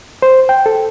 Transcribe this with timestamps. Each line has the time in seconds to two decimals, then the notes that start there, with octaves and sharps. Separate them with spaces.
0.22 C5
0.49 G5
0.66 A4